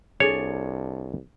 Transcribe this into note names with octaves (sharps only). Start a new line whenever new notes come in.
C2 D4 G#4 A4 C#5